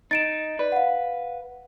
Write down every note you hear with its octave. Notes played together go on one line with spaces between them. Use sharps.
D#4 A6 D7 E7
B4 D5
F5 F#5